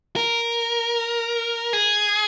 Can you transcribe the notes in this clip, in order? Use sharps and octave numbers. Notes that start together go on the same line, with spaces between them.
A#4
G#4